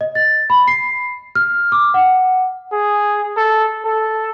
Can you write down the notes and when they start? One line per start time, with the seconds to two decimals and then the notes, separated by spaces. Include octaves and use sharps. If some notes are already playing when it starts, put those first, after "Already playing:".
0.01 D#5
0.15 A6
0.50 B5
0.68 C7
1.35 F6
1.72 D6
1.94 F#5
2.72 G#4
3.37 A4
3.85 A4